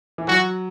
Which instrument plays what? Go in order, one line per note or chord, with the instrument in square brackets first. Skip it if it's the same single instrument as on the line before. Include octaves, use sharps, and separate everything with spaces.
[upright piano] E3
[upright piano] F#3 [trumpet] F#4